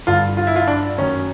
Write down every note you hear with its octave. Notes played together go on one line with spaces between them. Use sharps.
G2 D3 F4
F4
E4
F4
D4
F#2 D#3 C#4